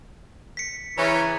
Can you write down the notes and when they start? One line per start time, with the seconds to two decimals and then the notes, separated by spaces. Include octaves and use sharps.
0.57 B6 C#7
0.98 C#3 E3 C#4 A#5